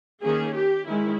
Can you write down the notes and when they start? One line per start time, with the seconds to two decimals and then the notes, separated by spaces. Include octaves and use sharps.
0.22 D#3 A#3 C#4 G#4
0.54 G4
0.87 D#3 G#3 C#4 E4